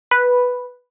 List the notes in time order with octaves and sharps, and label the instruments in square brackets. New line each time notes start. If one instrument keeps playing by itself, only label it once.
[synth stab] B4